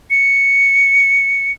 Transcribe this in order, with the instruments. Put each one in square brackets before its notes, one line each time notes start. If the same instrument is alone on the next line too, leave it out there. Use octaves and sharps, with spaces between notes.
[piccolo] C#7